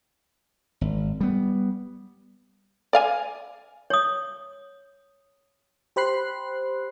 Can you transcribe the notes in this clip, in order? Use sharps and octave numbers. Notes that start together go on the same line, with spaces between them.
G#1
G3 B3
D5 F5 G#5
C#5 D#6
G4 C5 B5 F#6 C7